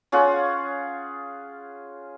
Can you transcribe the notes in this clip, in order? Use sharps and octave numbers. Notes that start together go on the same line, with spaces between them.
C#4 F4 G#4 F#5